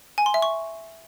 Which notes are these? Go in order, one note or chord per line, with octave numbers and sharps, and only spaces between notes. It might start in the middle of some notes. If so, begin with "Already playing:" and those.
G#5
C6
E5
C#6